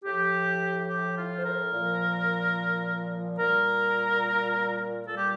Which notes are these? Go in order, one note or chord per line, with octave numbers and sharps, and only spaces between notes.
A2 F3 G4
G4
F4
C5
A#4
A#2 F3
A#2 G3 A#4
A#2 G3 A4
G4